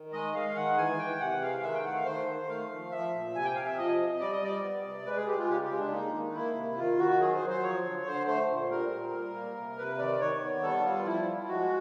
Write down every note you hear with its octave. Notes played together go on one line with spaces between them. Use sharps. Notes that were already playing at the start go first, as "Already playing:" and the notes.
Already playing: D#3
G#3 D#5
G#3 F5
D#3 F#5
E3 G#5
E3 G5
C3 F#5
G#3 F5
D#3 E5
G5
A3 F#5
F5
D#3 C5
D#3
A3 F5
F3
F3 E5
A#2
C3 G#5
G5
C3 F5
E5
F3 D#5
C3
G3 D5
D#5
G3 D5
B3
C3
G#3 B4
G#4
G#3 G4
F4
C#3 G4
G4
G#3
D4
A#3 D#4
D#3
A#3 E4
C3
D#3 F4
D#3 F#4
F#3 G#4
C5
F#3
C5
F3 C#5
D3
D3 C5
A3 C5
A#2
G3 A#4
A#2
G3
A#3
C3
C3 B4
D#3 D5
D#3 C#5
B3
G3 A4
G3 F4
F3 E4
F3
G#3 F#4